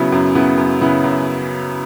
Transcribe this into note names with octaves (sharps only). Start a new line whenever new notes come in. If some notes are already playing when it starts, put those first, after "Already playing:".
Already playing: C#3 F#3 B3 E4
F#2
C#3 F#3 B3 E4
F#2
C#3 F#3 B3 E4
F#2